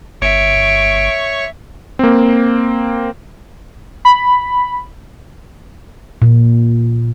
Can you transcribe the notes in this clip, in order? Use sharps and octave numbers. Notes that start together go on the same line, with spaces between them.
G1 C#5 E5 C#6 D7
A#3 C4
B5
A#2